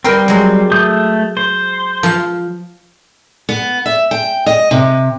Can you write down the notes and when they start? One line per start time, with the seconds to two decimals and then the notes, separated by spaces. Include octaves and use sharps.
0.04 G3 C4 A#4 B4 G5
0.28 F#3 G#3
0.72 A3 D#6 G6
1.37 C5
2.03 F3 F5
3.49 B3
3.86 E5
4.11 G5
4.46 D#5
4.71 C3